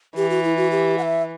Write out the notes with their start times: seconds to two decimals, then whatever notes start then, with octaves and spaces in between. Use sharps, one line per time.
0.16 E3 G4
0.30 F#4
0.44 E4
0.57 F#4
0.72 G4
0.98 F#5
1.02 E5